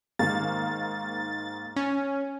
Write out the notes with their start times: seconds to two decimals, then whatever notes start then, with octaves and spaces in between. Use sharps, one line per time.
0.19 G#2 D#3 A#3 A6
1.76 C#4